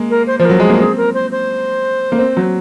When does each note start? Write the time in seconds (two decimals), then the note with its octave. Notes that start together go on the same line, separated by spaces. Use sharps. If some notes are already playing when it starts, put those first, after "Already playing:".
Already playing: G#3 A#3
0.11 A#4
0.27 C5
0.39 F3 C5
0.45 F#3 A#4
0.60 G#3 G#4
0.70 A#3
0.80 C4 G#4
0.97 A#4
1.14 C5
1.32 C5
2.12 A#3
2.19 C4
2.37 F#3